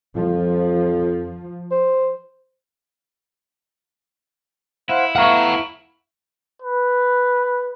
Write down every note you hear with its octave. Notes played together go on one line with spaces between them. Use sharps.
F2 F3
C5
E4 C5 F5 F#5
A3 B3 F5 F#5 A#5 C#6
B4